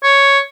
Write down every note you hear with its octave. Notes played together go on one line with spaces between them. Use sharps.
C#5